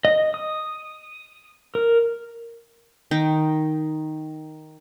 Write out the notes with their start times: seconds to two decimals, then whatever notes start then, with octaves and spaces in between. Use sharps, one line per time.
0.05 D#5
0.34 D#6
1.75 A#4
3.11 D#3 G5